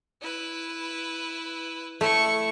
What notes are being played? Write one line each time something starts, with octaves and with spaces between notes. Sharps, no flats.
E4 B4
A3 E4 C#6